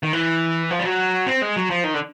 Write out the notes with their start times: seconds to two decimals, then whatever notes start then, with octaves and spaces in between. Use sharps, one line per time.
0.03 D#3
0.13 E3
0.71 F3
0.79 G3
0.85 F#3
1.27 C4
1.42 G#3
1.56 F#3
1.70 F3
1.84 D#3
1.94 D3